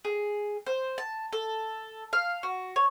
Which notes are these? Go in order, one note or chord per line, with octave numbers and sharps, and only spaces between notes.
G#4
C5
A5
A4
F5
F#4
C#5